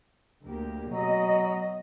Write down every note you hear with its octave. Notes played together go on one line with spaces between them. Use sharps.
D2 A#3 G4
B2 F#3 D#5